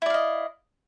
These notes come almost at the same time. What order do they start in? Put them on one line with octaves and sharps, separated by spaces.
E4 D5 F5 D#5